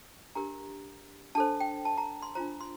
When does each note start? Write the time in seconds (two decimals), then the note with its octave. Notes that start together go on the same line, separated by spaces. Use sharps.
0.35 D4 G4 A#4 A#5
1.35 D4 A4 C5 A5
1.60 G5
1.85 A5
1.98 A#5
2.22 C6
2.35 D4 F4 C5 A#5
2.61 C6